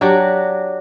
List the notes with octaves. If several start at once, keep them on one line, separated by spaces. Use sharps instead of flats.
F#3 D4 F#4 G4